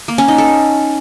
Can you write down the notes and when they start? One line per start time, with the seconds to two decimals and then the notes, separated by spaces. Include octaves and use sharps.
0.08 A#3
0.18 C#4
0.28 D#4
0.38 A4